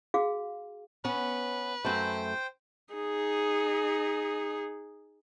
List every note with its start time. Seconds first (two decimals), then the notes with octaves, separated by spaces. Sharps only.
0.14 F#4 G#4 F5
1.05 B3 C#4 B4
1.85 F#2 A3 C5 G5
2.94 D#4 G#4